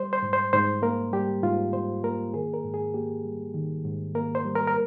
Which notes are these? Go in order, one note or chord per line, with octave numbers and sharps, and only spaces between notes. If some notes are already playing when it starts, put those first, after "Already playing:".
Already playing: G3 C5
C5
G#2
C5
G#2 C5
A#3 A#4
G3 G4
G#2 F4
G#2 C5
A#3 A#4
D#3 G#4
A#4
G#2
G#4
A#3 G4
G3
D#3
G#2
A#3 A#4
C5
G3
A#4
A#4